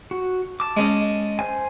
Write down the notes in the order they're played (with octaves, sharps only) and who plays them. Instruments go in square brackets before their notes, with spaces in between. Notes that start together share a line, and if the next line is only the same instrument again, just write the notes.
[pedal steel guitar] F#4
A5 D6
[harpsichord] G#3 C#4 D#5
[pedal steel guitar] C5 G#5